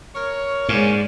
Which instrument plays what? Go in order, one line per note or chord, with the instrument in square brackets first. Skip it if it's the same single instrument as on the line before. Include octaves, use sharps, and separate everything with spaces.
[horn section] A#4 C#5
[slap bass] G#2 [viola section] G#3 D5 [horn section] A#3 C#4